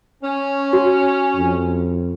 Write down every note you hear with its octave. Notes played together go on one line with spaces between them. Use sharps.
C#4
F#4
F2